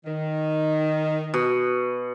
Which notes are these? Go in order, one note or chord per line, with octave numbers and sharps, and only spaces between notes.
D#3
B2